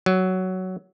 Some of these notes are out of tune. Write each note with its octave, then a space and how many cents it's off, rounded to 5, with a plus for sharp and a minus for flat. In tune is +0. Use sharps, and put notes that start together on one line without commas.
F#3 +10